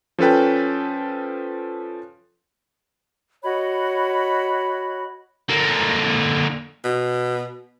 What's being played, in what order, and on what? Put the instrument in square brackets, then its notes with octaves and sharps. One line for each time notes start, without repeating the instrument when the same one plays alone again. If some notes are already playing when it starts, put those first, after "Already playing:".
[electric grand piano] F3 C#4 A4 B4 G5
[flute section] F#4 C#5 D#5 B5
[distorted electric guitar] D3 A#3
[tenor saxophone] B2